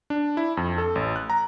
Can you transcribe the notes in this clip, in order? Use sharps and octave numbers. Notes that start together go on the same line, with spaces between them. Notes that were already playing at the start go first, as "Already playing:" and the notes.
D4
E4
F2
A4
A1
F#6
A#5